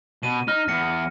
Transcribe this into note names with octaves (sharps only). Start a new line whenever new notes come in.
B2 D#7
D#4 F6
E2 A#6 C#7